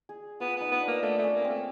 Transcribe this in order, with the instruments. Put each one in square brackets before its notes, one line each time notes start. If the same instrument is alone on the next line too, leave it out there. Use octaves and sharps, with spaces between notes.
[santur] G#4
[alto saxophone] B3 [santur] F4
[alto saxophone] B3 [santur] D#4
[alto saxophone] B3
[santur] D4
[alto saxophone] A#3
[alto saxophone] A3 [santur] D4
[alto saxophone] A3
[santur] C#4
[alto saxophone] A#3
[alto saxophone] A3 [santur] C4